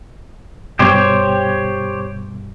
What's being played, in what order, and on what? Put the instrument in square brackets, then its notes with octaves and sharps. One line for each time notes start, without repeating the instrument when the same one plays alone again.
[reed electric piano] G2 B2 G3 [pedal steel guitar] G4 C5 C#5